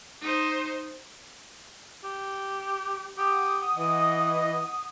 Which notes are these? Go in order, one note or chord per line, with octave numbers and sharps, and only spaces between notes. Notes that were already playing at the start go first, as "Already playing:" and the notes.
D#4 C5
G4
G4 F#5 D#6
E3 D#5